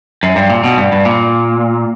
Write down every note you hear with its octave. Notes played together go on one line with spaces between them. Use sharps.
F#2
G2
A#2
B2
G2
G2
A#2